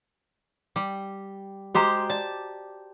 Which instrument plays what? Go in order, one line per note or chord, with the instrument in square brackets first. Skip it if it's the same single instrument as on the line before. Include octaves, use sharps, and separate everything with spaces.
[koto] G3
[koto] G#3 G4 C5 [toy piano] F#4 A#5 D6
[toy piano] D5 [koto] A5